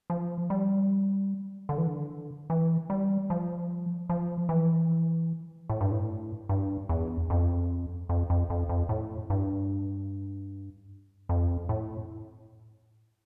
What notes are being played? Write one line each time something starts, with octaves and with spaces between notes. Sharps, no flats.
F3
G3
D3
E3
D3
E3
G3
F3
F3
E3
A2
G2
A2
G2
E2
F2
F2
F2
F2
F2
A2
G2
F2
A2